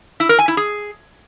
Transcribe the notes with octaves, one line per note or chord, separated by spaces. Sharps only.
E4
A#4
G#5
E4
G#4